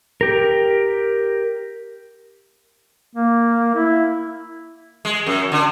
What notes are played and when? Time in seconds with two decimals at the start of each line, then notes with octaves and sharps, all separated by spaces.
0.21 G4 A#4
3.15 A#3
3.75 E4
5.05 G#3
5.27 F#2
5.52 D3